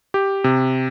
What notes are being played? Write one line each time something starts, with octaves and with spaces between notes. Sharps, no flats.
G4
C3